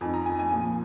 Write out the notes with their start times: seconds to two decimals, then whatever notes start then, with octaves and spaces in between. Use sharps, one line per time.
0.01 F2 D#3 G#5
0.14 A#5
0.26 G#5
0.39 G#5
0.51 A#2 F3 G#5